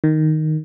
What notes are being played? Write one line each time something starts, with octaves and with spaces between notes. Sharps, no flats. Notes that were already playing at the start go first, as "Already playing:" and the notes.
D#3